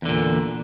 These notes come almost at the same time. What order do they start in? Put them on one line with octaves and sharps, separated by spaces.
E2 D3 A#2